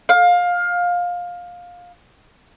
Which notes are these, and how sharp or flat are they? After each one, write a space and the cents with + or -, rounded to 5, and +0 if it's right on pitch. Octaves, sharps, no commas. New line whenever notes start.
F5 +20